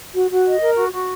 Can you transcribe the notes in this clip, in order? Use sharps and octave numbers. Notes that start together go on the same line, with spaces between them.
F#4
F#4
D#5
A#4
F#4
F#4